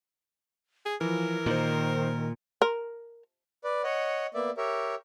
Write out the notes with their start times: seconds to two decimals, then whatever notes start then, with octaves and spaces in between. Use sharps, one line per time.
0.86 G#4
1.01 E3 F3 A#4
1.46 A#2 D#3 D#4 C5
2.62 A#4
3.64 B4 D5
3.84 C#5 D#5 F#5
4.34 A#3 B3 D5 E5
4.57 G4 A#4 C#5 E5